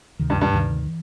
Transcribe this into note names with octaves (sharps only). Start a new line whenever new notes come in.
D2 C3 D#3
G2
G2
D2 C3 D#3
E3